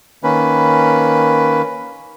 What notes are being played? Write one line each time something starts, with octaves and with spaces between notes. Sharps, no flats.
D#3 A#3 C#4 B4